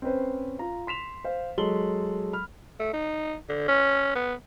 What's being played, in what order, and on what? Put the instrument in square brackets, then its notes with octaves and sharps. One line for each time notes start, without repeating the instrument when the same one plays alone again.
[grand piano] C4 C#4 B4 C5
F4 A#5
C6 B6 E7 F7
C5 F5
F#3 G#3 A4 C6 F#7 G7
B5 F6
[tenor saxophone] A3
D#4
D3
C#4
B3